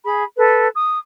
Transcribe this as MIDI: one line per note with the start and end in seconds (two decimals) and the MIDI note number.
0.03 0.24 68
0.03 0.24 83
0.37 0.67 69
0.37 0.67 71
0.75 1.00 87